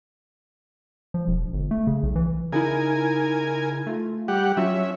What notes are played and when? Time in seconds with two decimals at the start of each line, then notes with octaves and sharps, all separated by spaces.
1.14 F3
1.27 E1
1.53 G1
1.71 A3
1.87 C#3
2.03 B1
2.16 E3
2.53 C#3 D#4 E4 A#4 G#5
3.87 A3 F4
4.28 G3 G4 F#5
4.57 F#3 C#4 F4 F#4 E5